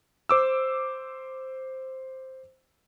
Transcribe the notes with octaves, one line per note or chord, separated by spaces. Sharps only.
C5 D6 E6